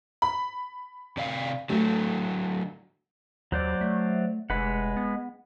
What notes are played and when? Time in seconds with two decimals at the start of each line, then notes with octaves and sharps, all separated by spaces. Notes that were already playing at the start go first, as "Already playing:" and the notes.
0.22 B5
1.17 C3 D5 F5
1.70 D3 F#3 A3
3.52 D#2 F#3 C5 D5
3.81 A3
4.50 F1 G#3 B4 F#5
4.97 B3